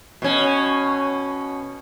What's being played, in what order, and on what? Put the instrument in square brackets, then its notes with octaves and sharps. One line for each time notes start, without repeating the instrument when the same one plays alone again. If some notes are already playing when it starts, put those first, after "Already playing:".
[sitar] B2 C#4